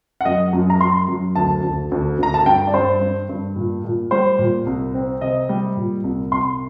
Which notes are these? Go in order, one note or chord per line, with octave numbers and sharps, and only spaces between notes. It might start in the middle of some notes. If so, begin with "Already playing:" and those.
F#5
F#2 D#5
F#2
A#5
F#2 C6
F#2
D2 A5
D2
D2
D2 A#5
A5
G2 G5
D5
G2 C5
G2
G2
A#2
A#2
G3 C5
A#2
C2
C4
C3 D#5
G3
A#2
C2
C2 C6